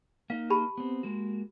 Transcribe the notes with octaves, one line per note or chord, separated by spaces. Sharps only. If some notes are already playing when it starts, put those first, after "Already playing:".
A#3 D#4 F5
G4 A5 B5
B3 C4
G#3 A#3 F#4